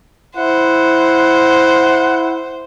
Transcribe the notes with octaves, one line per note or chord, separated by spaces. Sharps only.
E4 C5 F#5